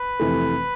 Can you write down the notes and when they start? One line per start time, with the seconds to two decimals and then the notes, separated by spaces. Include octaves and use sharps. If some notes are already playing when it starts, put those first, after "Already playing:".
Already playing: B4
0.19 F2 C3 E3 A3